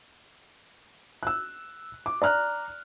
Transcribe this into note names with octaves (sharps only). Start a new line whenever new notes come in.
E6 F#6
D6
D5 A#5 F6 F#6